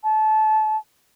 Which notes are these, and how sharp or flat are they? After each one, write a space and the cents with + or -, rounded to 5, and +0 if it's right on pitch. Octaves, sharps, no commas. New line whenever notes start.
A5 -25